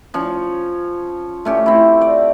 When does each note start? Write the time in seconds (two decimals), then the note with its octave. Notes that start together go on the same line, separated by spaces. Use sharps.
0.14 F3 C#4
1.45 A3 C#4 G4
1.66 C4 E4
2.01 D5